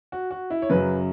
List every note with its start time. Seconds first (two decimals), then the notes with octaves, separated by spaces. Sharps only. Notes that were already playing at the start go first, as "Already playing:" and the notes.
0.12 F#4
0.31 F#4
0.50 E4
0.62 C#5
0.70 F#2 C#3 F#3 B4